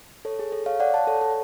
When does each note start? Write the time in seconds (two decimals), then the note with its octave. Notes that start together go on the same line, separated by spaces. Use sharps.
0.25 A4 C#5
0.39 G#4
0.52 A4
0.66 C#5 F5
0.80 D5 F#5
0.94 F#5 A5
1.07 A4 C#5
1.21 A4